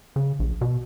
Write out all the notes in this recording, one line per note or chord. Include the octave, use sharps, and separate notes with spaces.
C#3
A#1
B2